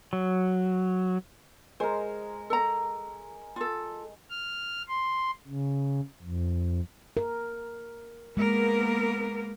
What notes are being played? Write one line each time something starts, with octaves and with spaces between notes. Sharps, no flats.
F#3
G#3 A#4 C5
A4 A#5
F4 A4
F6
C6
C#3
F2
A#4
G#3 A#3 B3 A#4